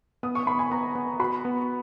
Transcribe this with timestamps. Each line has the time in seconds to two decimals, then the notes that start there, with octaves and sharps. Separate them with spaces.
0.23 B3 D#6
0.35 C#6
0.47 B3 B5
0.59 G#5
0.71 B3 A#5
0.95 B3
1.19 F#4 B5
1.45 B3